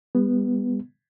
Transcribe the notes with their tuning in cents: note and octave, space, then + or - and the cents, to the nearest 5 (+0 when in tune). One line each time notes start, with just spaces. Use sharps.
G3 +40 B3 +0